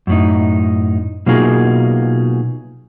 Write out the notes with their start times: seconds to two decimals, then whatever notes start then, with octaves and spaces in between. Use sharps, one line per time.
0.07 F#2 A2 D#4
1.26 B2 F#3 A#3 D#4 F4 G#4